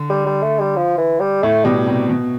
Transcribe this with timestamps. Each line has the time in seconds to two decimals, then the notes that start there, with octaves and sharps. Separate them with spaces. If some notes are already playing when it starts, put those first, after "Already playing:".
Already playing: D3
0.10 G3
0.26 G3
0.43 A3
0.60 G3
0.76 F3
0.98 E3
1.20 G3
1.43 A2 A3
1.65 B2 G3
1.86 C3 G3
2.10 B2